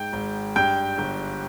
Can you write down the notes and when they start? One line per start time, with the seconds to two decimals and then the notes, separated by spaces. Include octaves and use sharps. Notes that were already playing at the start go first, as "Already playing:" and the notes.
Already playing: G#2 G5 G6
0.13 G#1
0.56 G2 G5 G6
0.98 G1